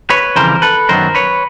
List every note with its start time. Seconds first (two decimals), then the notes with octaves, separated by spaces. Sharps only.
0.10 B4 C#5
0.36 F2 C#3 E3 G3 A#4 C5
0.62 A4 B4
0.89 F#2 D#3 F#3 B3 A#4 C5
1.15 B4 C#5